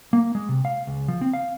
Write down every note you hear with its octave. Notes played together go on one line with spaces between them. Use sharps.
A#3
G#3
C3
F5
C#2
F3
C4
F5